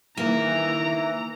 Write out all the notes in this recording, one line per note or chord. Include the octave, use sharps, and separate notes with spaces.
D#3 E3 A#3 E4 A#5